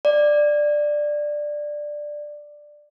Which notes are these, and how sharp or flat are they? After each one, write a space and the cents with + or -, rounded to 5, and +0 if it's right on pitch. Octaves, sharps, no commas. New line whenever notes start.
D5 +10